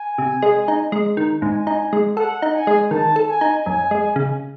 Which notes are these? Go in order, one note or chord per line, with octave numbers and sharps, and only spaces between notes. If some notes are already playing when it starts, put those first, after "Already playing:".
Already playing: G#5
C3
G#3
D#4
G#3
D#3
G#2 G#5
D#4
G#3
A4 F#5
D#4
G#5
G#3
D#3 A5
A4
G#5
D#4
F#2 G#5
G#3
C#3